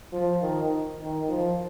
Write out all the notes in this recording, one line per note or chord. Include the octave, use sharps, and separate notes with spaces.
F3
D#3
D#3
F3